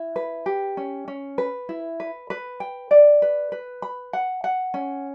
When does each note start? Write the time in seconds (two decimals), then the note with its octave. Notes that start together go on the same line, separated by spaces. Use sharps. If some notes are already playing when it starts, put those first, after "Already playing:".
Already playing: E4
0.16 B4
0.46 G4
0.77 C#4
1.08 C#4
1.38 B4
1.69 E4
2.00 B4
2.30 B4
2.60 G5
2.91 D5
3.22 B4
3.52 B4
3.82 B5
4.13 F#5
4.44 F#5
4.74 C#4